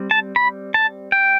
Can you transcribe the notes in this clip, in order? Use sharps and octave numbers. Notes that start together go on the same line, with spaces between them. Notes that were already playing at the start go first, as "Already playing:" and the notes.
Already playing: G3 C4
A5
B5
A5
G5